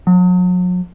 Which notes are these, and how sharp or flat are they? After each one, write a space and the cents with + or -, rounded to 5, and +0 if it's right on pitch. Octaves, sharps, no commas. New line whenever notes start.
F#3 -40